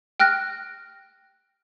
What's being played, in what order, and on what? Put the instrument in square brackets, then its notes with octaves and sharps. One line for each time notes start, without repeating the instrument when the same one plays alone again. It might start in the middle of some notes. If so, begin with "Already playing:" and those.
[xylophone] G5 F6 F#6 A#6